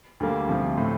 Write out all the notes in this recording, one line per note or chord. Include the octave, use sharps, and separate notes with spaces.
D2 D3 G3 A#3
D2 C3 F3
A2 A3 C4